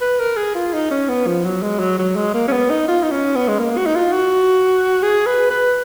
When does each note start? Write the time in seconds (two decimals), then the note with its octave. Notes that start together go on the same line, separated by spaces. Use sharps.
0.01 B4
0.19 A#4
0.37 G#4
0.55 F4
0.73 D#4
0.91 C#4
1.08 B3
1.27 F3
1.44 F#3
1.62 G#3
1.80 F#3
1.99 F#3
2.16 G#3
2.34 A#3
2.48 C#4
2.51 B3
2.70 D#4
2.88 F4
3.03 D#4
3.12 C#4
3.35 B3
3.48 G#3
3.59 A#3
3.77 F#4
3.86 D#4
3.95 F4
4.13 F#4
5.03 G#4
5.26 B4
5.50 B4